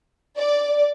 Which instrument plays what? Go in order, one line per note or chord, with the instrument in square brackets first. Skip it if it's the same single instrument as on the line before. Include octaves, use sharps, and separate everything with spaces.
[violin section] D5